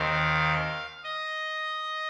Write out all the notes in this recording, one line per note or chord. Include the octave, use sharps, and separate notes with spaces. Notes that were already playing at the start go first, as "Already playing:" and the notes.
Already playing: D#2 D#3 C4 F5
D#5